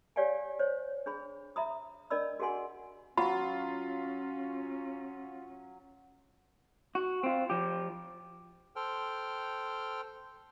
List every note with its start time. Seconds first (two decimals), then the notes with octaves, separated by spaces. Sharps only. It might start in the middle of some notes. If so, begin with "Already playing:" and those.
0.16 G4 C#5 D5 F5 G5 G#5
0.59 C5 C#5
1.06 D4 G#4 B5
1.56 E5 A#5 B5 D#6
2.10 D4 A#4 D5 D#5 B5 E6
2.39 F#4 G#4 A#4 F#5 G#5 C6
3.17 F#3 C#4 F4 B5
6.95 F#4
7.23 C4 F4
7.50 F3 G4
8.76 A4 C5 G5 F6